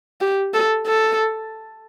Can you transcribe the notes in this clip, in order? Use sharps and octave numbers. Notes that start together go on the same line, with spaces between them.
G4
A4
A4